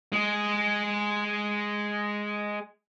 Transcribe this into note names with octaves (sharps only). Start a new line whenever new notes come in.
G#3 G#4